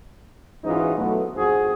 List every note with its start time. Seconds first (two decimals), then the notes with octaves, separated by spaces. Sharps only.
0.64 G#2 E3 C#4 D#4 F4 F#4
0.97 B1 A3 B3
1.36 G#1 F2 C4 F#4 G#4